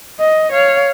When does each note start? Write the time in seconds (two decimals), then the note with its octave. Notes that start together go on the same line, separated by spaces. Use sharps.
0.20 D#5
0.52 C#5 F5